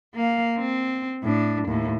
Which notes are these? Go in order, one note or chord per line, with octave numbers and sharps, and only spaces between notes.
A#3 F5
C4
A2 D4
D#2 A2